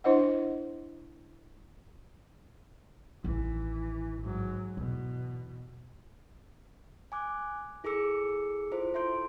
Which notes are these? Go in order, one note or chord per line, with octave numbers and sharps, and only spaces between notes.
D4 E4 C5 D#5 F#5
A1 D#3 E3
G#2 F#3
E2 B2
G#5 D6 F#6
E4 G#4 A4 D6 E6 C#7
E4 F4 A4 C5
E4 E5 C6 G6 D7